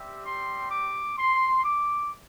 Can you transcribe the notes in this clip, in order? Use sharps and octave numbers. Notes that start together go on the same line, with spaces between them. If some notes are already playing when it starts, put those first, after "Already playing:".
Already playing: G3 C4 G4 E5
C6
D6
C6
D6